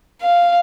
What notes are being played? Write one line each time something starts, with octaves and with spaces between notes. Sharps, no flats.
F5